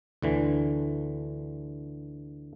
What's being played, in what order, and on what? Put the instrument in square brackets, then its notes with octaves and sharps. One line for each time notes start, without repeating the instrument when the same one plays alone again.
[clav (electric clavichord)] D2 D3 E3